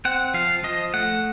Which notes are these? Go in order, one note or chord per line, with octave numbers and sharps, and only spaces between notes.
C4 F#5
F3 F5
F3 D#5
A3 F#5